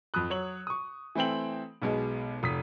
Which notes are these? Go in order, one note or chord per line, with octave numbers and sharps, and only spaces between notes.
F2 B5 D#6 F#6
F#3 C#5 F#7
C#6 D#6
E3 A3 C4 G5 F#7
B1 B2 G#3
F1 D#6 B6